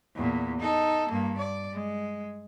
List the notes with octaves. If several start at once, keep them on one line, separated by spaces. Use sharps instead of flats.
E2 A#2
D#4 A4
G2 A#3
D5
G#3